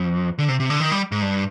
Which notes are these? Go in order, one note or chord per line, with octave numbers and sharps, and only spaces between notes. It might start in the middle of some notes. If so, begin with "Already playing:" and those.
Already playing: F2
D3
C3
C3
D3
D#3
G3
G#2
G2